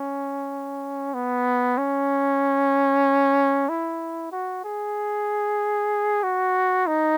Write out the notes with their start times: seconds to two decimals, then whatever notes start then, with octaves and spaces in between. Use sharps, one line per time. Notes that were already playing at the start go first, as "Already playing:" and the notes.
Already playing: C#4
1.14 B3
1.78 C#4
3.69 E4
4.32 F#4
4.64 G#4
6.23 F#4
6.87 D#4